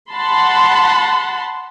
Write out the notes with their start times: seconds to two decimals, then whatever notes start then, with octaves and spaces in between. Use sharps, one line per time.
0.12 F#5 A5 B5 C6